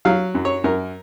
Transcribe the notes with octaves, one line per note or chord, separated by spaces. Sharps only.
F#3 F5
F#2
C#5
F#2 A#4